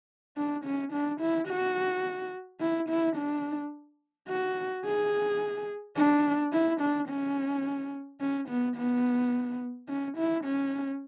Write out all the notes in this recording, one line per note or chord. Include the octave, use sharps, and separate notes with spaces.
D4
C#4
D4
E4
F#4
E4
E4
D4
F#4
G#4
D4
E4
D4
C#4
C#4
B3
B3
C#4
E4
C#4